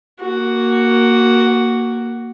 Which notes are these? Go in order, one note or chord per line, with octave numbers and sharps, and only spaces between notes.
A#3 F#4